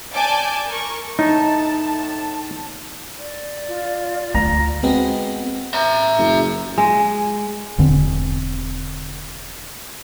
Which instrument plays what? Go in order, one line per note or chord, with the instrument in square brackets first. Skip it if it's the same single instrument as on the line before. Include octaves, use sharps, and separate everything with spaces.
[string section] D5 G#5 A5 D6 G6
A#4 C#6
[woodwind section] A2 A5 [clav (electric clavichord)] D#4
[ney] D5
[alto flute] F4
[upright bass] D2 [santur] A#5
[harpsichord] G#3 B3 C4 F#4
[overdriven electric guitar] E5 A#5
[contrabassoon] F#1
[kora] G#3
[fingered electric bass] E1 E2 D3 C4